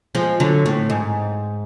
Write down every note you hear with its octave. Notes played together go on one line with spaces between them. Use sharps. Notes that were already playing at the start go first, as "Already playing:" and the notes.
F3 G#3
D3 F#3
A2
G#2